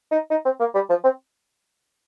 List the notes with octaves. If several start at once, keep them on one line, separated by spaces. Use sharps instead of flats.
D#4
D#4
C4
A#3
G3
F3
C4